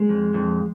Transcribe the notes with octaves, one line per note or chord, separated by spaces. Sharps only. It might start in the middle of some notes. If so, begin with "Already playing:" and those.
Already playing: G#3
F2
F2